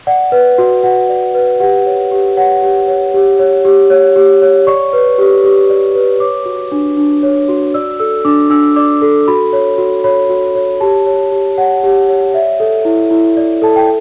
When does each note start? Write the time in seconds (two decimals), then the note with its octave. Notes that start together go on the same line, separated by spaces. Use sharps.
0.07 D5 F#5
0.32 B4
0.58 F#4
0.84 F#4 F#5
1.09 D5
1.34 B4
1.60 G4 F#5
1.86 C#5
2.11 G4
2.37 C#5 F#5
2.62 G4
2.88 C#5
3.14 G4
3.39 C#5
3.65 G4
3.90 C#5
4.16 G4
4.42 C#5
4.67 D5 C#6
4.93 B4
5.18 G4
5.44 G4
5.70 D5
5.95 B4
6.20 C#5 D6
6.46 F#4
6.72 D4
6.97 D4
7.23 C#5
7.48 F#4
7.74 D5 E6
8.00 A4 E6
8.25 D4 D6
8.50 D4 E6
8.76 D5 D6
9.02 A4
9.28 F#4 B5
9.53 C#5
9.78 F#4
10.04 C#5 B5
10.30 F#4
10.55 C#5
10.81 G4 A5
11.06 C#5
11.32 G4
11.58 C#5 F#5
11.83 G4
12.09 C#5
12.34 D5 E5
12.60 A4
12.85 E4
13.11 E4
13.37 D5
13.62 A4 A5
13.76 G5